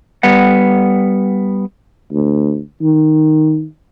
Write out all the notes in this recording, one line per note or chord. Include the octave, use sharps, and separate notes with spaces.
G3 B3 F#5
D2
D#3